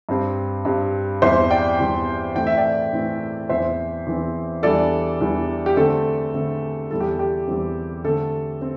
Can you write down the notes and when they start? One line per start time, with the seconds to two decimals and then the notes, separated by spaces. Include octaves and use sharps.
0.09 G2 G3 C4
0.65 G2 G3 C4
1.22 E2 E3 G3 C4 C5 E5
1.51 D5 G5
1.79 E2 E3 G3 C4
2.36 A2 E3 A3 C4 G5
2.47 E5
2.57 D5 G5
2.93 A2 E3 A3 C4
3.49 E2 E3 C4 C5 E5
4.06 E2 E3 C4
4.63 E2 E3 G3 D4 A4 D5
5.20 E2 E3 G3 D4
5.66 G4
5.77 D3 A3 C4 A4
6.34 D3 A3 C4
6.91 E2 E3 G3 C4 A4
7.00 G4
7.19 G4
7.48 E2 E3 G3 C4
8.04 D3 A3 C4 A4
8.62 C4